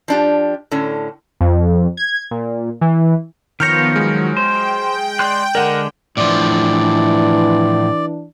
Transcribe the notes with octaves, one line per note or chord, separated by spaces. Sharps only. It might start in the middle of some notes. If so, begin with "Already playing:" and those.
F3 D4 G4
A2 D3 C#4
F2
G#6
A#2
E3
D#3 F3 B3 F4 C#5 F6 G6 A#6
F#3 G#3
C5 G5
G5
D5 C6 F#6
D3 G#3 A#4 D5 F#5
A2 E3 F3 D4 D5